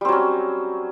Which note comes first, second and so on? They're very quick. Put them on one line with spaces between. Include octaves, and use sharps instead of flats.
G3 C4 F#3 C#4